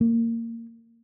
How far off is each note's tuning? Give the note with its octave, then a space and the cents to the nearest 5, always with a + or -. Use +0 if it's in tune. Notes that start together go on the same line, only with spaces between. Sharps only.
A#3 -20